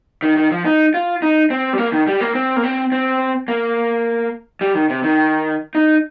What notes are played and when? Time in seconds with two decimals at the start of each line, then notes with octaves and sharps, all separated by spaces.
0.22 D#3
0.37 D#3
0.51 F3
0.65 D#4
0.94 F4
1.22 D#4
1.50 C4
1.73 G3
1.78 A#3
1.92 D#3
2.07 G3
2.20 A#3
2.35 C4
2.56 A#3
2.64 C4
2.92 C4
3.48 A#3
4.61 G3
4.75 D#3
4.90 C3
5.03 D#3
5.75 D#4